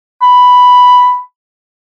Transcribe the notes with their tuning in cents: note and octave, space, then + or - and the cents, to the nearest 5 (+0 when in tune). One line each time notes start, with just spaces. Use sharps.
B5 +0